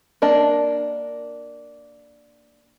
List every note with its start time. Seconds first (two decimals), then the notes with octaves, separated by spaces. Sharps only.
0.22 A#3 D4 D#5 A5